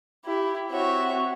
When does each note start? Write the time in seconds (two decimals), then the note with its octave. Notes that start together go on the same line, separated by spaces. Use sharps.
0.25 E4 G4
0.71 C4 F#4 C#5 E5